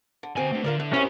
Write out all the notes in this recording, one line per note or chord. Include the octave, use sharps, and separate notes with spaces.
D3
D2 B2 C4 G#5
A3 D4
D3 F4 A#4 D5
A2 D3
F#2 C4 C#4 E4 G4